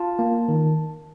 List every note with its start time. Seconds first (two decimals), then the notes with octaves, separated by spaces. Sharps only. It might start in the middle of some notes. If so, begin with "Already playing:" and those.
Already playing: F4 A5
0.19 A#3
0.48 D#3